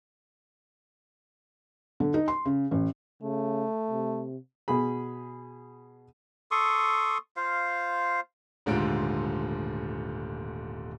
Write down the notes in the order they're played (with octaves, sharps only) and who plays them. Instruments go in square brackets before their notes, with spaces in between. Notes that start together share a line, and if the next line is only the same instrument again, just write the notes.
[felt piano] D3
D#4
C6
C#3
A1
[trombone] C#3 [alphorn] A3
[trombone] C3
[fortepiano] B2 G#4 B5
[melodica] A4 C6 C#6 D#6
F4 C5 F5
[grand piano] D#1 G#2 D3 A3 F4 D7